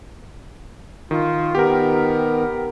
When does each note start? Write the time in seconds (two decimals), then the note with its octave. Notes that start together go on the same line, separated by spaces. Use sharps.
1.11 D#3 F4
1.55 D#3 B3 G4 A#4